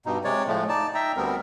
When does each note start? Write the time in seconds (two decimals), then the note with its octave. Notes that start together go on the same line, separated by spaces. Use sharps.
0.06 G2 B2 D#4
0.24 C3 G#3 C#5 D5
0.47 A2 F3 G#3 A3
0.69 D#4 D5 A5
0.95 D#4 E5 G5 A#5
1.17 D2 G3 B3 C4 A#4